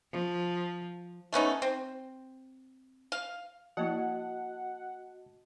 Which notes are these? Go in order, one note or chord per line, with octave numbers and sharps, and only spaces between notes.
F3
A3 B3 C#4 D#4
C4
F5
F3 A#3 E4 F#4 D#5 F#5 A5